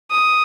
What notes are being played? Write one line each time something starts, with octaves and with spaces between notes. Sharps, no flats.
D#6